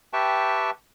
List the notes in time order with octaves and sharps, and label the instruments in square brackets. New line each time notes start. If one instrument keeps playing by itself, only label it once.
[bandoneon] G4 B4 E5 G5 A5 C#6